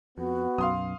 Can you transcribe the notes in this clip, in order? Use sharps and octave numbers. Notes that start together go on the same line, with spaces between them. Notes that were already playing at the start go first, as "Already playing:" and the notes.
F2 B3 F#4
B1 F#2 B2 F5 C6 D#6